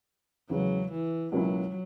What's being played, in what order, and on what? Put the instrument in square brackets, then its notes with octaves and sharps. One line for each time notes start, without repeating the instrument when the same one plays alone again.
[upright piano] E2 C#3 G#3 [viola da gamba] F#3
[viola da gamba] E3
[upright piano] C#2 B2 A#3 C#4 E4 [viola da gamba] F#3